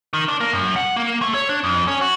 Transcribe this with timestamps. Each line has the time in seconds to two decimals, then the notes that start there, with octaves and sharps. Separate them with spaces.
0.13 D#3
0.28 D4
0.41 A#3
0.54 F#2
0.76 F#5
0.96 A#3
1.22 A3
1.34 C#5
1.49 D4
1.64 F2
1.87 C#4
2.01 F#4